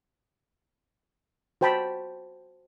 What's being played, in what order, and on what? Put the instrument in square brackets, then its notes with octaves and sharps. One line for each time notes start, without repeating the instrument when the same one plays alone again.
[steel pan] F#4 C5 G5 A5 B5